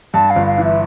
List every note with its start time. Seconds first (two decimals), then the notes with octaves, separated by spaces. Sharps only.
0.14 G2 A5
0.30 F5
0.36 G1
0.47 F5
0.58 E3
0.64 E5